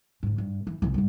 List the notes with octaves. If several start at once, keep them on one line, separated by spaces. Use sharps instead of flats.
G#2 D3
G2
E3
C2 E3
G#2 G3